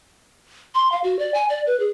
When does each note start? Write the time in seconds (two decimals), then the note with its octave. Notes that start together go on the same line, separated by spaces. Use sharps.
0.75 C6
0.92 F5
1.04 F#4
1.19 D5
1.34 G#5
1.50 D5
1.67 B4
1.80 G#4